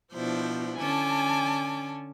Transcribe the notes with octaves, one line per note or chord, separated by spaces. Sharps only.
B2 F3 D4 E4 C5
D3 C#4 G#5 A5 D6